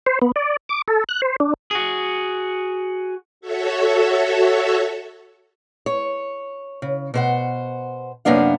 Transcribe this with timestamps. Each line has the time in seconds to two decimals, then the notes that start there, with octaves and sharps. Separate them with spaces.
0.06 C5
0.22 B3
0.36 D5
0.69 D6
0.88 A4
1.09 F#6
1.22 C5
1.40 D4
1.71 F#4 G#4
3.41 F#4 A4 C#5 E5
5.86 C#5
6.82 C#3
7.14 B2 C5 F#5
8.25 F#2 C3 A#3 B3 D4 F5